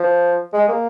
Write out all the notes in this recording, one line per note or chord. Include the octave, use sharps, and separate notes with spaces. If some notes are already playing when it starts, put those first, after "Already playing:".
Already playing: F3
G#3
A#3